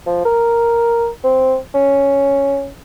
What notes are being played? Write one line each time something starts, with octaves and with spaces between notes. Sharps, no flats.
F3
A#4
C4
C#4